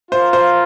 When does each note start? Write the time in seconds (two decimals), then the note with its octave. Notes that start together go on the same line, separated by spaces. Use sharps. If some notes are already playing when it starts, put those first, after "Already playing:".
0.11 F4 A#4 C5 F5
0.33 C5